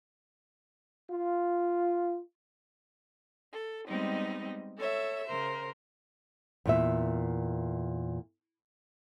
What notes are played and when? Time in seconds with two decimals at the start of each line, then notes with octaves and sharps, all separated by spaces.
1.10 F4
3.54 A4
3.88 G3 G#3 B3 C4 D#4 D#5
4.77 A4 C#5 E5
5.27 C#3 A#4 C5
6.66 E2 A#2 E5